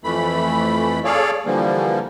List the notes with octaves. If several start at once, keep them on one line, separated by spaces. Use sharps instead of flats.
F2 E3 A3 B5
G#4 A4 C#5 D5 F5
D3 E3 F3 G3 A#3